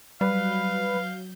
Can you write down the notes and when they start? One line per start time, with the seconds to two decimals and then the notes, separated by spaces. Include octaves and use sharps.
0.21 F#3 G3 B4 F5 G6